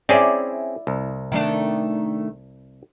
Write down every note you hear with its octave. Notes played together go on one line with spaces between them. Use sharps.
C4 C#4 E4 G#4 D5
C2
D#3 A3 D4